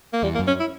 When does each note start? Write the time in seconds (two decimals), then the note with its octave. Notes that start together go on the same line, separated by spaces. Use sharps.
0.13 A#3
0.23 E2 G3
0.35 A#3
0.39 F#2
0.47 C#4
0.60 E4